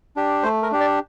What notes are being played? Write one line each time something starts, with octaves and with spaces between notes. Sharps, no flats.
D4 G4
A3 C5
A#4
D4 G4
D5